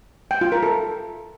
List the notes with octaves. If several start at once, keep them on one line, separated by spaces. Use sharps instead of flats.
G5
F4
A#4
A4